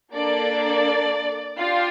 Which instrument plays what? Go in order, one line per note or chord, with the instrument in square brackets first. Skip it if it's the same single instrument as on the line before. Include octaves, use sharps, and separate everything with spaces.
[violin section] A#3 D4 A4 D5
D4 F4 G4 F5